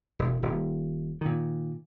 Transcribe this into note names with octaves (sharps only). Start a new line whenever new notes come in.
E1
D#1
A#2 D#3